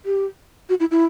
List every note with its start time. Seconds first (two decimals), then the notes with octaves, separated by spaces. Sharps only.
0.06 G4
0.69 F#4
0.80 E4
0.91 E4